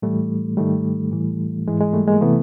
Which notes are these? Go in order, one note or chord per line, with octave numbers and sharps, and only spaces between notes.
A2 E3 G3 A3
G#2 D#3 G3 A3
A2 E3
G#2 E3 G#3
G#3
G3 A3
G#3 A#3
C3 E3 A3 B3